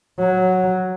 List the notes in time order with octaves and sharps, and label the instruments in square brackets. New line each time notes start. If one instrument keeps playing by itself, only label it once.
[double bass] F#3